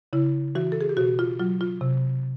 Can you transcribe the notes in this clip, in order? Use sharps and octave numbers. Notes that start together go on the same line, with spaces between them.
C#3 E4
E3 F#4
A4
G#4
G4
B2 F#4
F4
F#3 F4
F4
C3